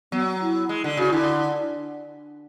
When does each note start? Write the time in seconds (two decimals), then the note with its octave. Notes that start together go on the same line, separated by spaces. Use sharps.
0.12 F#3 B3
0.41 E4
0.69 G#3
0.84 D3
0.97 C#3 F#4
1.12 D3 E4